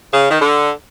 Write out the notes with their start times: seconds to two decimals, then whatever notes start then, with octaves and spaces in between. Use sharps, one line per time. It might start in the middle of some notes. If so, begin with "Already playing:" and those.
0.13 C#3
0.31 D#3
0.41 D3